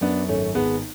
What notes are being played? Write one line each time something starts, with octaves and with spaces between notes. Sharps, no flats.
F#2 B3 D4
G#1 A3 C#4
G#1 G#3 B3